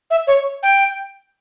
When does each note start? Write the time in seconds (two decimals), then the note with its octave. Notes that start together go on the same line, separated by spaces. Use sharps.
0.10 E5
0.27 C#5
0.62 G5